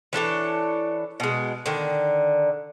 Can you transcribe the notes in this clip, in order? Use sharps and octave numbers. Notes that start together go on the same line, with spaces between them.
E3 D4 A4 C#5
B2 G#3
D3 D#3